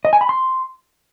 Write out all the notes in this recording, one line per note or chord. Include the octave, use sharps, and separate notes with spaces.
D#5
G#5
B5
C6